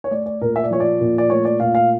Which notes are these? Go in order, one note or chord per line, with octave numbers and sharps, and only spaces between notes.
C#5
A3 D5
D5
A#2 A#4
E5
D5
F3 C#5
D5
A#2
D5
A3 C#5
D5
A#2 F5
F5